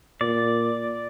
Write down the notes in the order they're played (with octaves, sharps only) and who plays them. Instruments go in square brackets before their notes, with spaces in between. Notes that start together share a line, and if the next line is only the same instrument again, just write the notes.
[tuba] A#2 [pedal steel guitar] D5